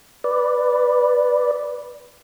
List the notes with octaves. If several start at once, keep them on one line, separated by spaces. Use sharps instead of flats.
B4 D5